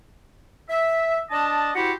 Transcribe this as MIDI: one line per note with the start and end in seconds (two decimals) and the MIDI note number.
0.69 1.19 76
1.31 1.71 62
1.31 1.71 74
1.31 1.71 75
1.31 1.71 81
1.75 1.92 64
1.75 1.92 66
1.75 1.92 67
1.75 1.92 72
1.75 1.92 78